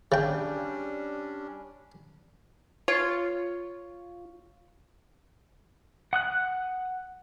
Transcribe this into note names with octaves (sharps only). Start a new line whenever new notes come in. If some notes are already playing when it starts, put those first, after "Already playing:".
C#3 G3 C#4 D4 G5
F4 C#5
F#5 D#6 F#6